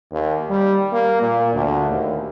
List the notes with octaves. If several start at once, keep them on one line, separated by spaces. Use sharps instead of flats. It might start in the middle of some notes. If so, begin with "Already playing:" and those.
D#2
G3
A#3
A#2
D2
D#2